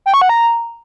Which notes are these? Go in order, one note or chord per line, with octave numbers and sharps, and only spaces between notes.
G5
C#6
F#5
A#5